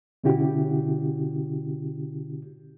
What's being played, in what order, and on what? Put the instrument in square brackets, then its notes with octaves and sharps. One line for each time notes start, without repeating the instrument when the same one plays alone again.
[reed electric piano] B2 D3 C#4 E4 F#4 G4